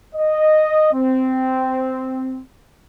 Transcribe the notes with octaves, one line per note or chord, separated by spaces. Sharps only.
D#5
C4